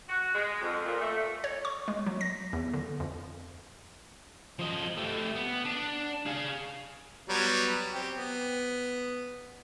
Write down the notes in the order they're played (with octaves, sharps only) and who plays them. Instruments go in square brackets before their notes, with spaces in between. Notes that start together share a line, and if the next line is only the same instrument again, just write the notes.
[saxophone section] F#4
G#3
F2
A#2
A3
[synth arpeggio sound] C#5
C#6
G#3
F#3
A#6
E2
D3
F2
[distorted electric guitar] F3 D#5
A3 G4
B3
D4
G#4 F5
[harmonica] F#3 G3 B3
C4 G4
B3